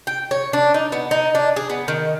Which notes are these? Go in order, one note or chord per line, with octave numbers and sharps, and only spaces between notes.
G5
C#5
D4
D#4
B3
D#4
D4
G#4
B3
D#3